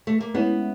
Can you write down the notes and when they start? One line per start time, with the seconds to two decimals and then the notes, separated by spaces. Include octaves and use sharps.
0.07 A3
0.20 A#3
0.34 G#3 B3 C#4 E4